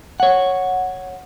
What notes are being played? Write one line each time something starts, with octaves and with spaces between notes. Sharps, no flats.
C#5 F#5